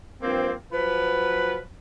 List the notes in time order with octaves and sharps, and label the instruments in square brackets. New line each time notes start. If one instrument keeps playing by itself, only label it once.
[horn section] G2 F3 A#3 C4
F3 F#3 B4